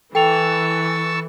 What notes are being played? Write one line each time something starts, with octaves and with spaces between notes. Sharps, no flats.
E3 A4 G5 A5 C#6 E6 F7